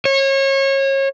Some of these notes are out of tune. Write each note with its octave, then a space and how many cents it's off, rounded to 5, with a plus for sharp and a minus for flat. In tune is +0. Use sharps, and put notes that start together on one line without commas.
C#5 -30